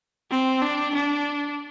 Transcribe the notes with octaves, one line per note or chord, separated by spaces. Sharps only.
C4
D4
D4